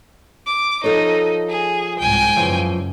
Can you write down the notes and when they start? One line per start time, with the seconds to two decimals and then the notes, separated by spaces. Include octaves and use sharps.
0.47 D6
0.84 F3 D#4 A4 C#5
1.49 G#4
1.99 C2 G#2 G5 G#5
2.36 F#1 F#2 C#3 E3 F3